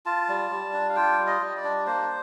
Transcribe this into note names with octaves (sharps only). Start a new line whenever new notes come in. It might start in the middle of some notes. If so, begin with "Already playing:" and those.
F4 A5
G3
G3
D4
F5
F4 G5
G3
D#5
G3
D5
D4
A#3 C5